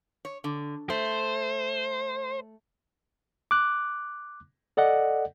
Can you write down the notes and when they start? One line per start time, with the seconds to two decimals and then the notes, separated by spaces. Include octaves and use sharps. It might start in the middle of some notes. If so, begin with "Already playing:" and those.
0.25 C#5
0.44 D3
0.90 A3 C5
3.51 D6 F#6
4.77 A4 D5 D#5 F#5